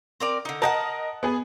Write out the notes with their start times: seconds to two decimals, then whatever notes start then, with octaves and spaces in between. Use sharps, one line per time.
0.20 C4 A#4 D5
0.45 D3 D#4
0.62 A#4 D#5 F#5 G5 A5
1.23 B3 G#4